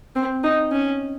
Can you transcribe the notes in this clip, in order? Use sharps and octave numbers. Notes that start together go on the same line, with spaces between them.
C4
D#4
C#4